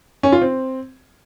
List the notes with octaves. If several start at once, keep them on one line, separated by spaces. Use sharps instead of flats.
C#4
F4
C4